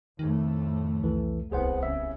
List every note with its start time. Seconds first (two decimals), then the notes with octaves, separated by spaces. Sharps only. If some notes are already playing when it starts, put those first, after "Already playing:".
0.19 F2 A2 D#3 A3
1.02 C2 E3 A4
1.52 D1 C2 B3 G#4 C5 F#5
1.83 C#3 E5